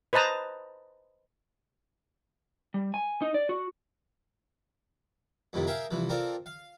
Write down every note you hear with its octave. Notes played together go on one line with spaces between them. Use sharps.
B4 C5 D#5 A5 A#5 D#6
G3
G#5
D#4
D5
F#4
F2 A2 C3 D#3
G#4 A#4 E5 F5 G5
C2 E3 F3
C4 F4 A4 A#4 D5
F5